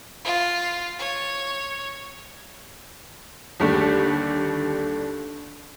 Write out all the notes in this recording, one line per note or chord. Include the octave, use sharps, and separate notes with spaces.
F4
C#5
D#2 D3 G3 A3